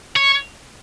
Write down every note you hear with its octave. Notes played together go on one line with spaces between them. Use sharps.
C#5